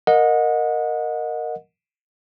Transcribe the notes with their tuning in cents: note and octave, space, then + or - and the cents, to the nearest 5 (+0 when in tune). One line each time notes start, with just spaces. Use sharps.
A#4 +0 D#5 -5 F#5 -30